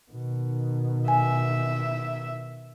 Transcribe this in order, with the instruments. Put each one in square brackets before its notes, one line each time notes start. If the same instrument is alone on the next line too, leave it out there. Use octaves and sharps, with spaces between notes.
[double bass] B2 D#3
[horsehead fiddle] E5 [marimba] G#5